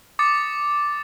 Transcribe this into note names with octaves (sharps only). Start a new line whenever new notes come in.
D6 D#6 A6 C#7